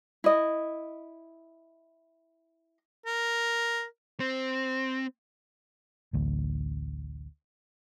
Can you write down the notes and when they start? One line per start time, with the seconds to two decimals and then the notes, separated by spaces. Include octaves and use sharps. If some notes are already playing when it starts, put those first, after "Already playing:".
0.24 E4 D#5
3.06 A#4
4.20 C4
6.13 A1 D2